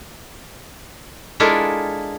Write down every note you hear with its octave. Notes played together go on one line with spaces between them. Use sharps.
G#3 D4 E4 F4 A4 A#4